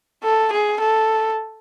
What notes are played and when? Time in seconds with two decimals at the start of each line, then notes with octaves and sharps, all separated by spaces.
0.24 A4
0.52 G#4
0.80 A4